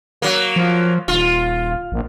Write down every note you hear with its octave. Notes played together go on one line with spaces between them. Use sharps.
F#3 A#3
F3
D#1 F4
A#1